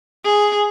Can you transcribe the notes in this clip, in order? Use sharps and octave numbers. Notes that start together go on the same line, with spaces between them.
G#4